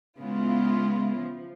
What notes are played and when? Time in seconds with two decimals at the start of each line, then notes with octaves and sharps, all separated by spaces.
0.20 C#3 G#3 B3 E4 F4
1.19 F3